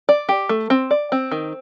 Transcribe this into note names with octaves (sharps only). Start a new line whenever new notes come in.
D5
G4
A3
C4
D5
C4
D#3